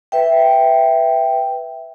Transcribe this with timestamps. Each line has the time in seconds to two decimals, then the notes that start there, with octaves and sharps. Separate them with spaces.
0.12 B4 E5 G5